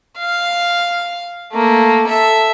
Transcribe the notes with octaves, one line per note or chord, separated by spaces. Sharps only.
F5
A3 A#3
A4 E5